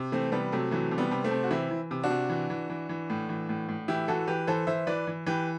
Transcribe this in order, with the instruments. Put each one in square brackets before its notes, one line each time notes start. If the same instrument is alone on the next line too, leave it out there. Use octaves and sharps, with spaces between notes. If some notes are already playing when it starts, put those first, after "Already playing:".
Already playing: [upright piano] C3
E3 A3 C4
C3 G3 B3
C3 F#3 A3
E3 F#3 A3
C3
G3 B3
C3
A3 C4
C3
F#4
E3 C4 E4
E3
C3
D4 F#4
C3
E3
E3
E3
E3
A2
E3
A2
A2
E3 E4 G4
E3 F#4 A4
E3 G4 B4
E3 A4 C5
E3 C5 E5
E3 B4 D5
E3
E3 G4 B4